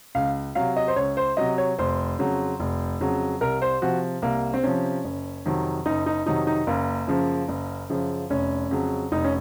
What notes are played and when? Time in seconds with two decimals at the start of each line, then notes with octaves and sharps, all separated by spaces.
0.15 C#2 F5
0.55 C3 F#3 F5
0.77 D#5
0.88 C5
0.96 C#2 C#5
1.17 C5
1.37 C3 F#3 D#5
1.58 C#5
1.78 F1 C5
2.19 F2 C#3 F#3
2.60 F1
3.00 F2 C#3 F#3
3.41 C2 A#4
3.62 C5
3.82 C3 F3 F#4
4.22 C2 A#3
4.54 C4
4.63 C3 F3 C#4
5.04 F#1
5.45 F2 C3 D#3 F#3
5.86 F#1 D#4
6.06 D#4
6.26 F2 C3 D#3 F#3 D#4
6.47 D#4
6.67 F#1 A#3
7.07 F#2 C#3 F3
7.48 F#1
7.90 F#2 C#3 F3
8.30 F1 C#4
8.71 F2 C#3 F#3
9.12 F1 D#4
9.24 C#4